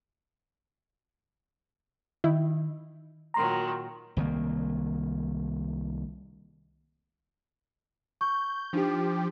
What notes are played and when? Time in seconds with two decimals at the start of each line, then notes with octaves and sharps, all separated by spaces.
2.24 D#3 E4
3.34 A#2 D#3 F#3 A#5 C6
4.17 C2 D#3 F3 A#3
8.21 C#6 G6
8.73 F3 D4 D#4 G4